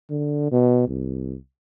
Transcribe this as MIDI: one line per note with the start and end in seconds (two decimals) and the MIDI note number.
0.10 0.49 50
0.52 0.85 47
0.88 1.36 36